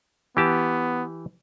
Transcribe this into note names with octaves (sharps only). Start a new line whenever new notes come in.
E3 B3 G4 A5